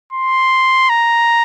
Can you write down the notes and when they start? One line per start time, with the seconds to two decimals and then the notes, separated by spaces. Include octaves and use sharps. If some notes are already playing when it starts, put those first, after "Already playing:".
0.13 C6
0.90 A#5